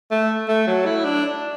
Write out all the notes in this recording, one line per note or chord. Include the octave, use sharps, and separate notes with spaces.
A3
A3
F#3
E4
D4